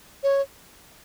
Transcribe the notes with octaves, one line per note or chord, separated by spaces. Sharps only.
C#5